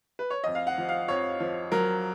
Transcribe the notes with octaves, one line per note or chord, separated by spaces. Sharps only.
B4
C#5
F2 D#5
F5
F#5
F3
F5
F2 C#5
F3
F#3 A#4